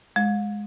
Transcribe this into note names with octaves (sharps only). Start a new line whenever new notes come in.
G#3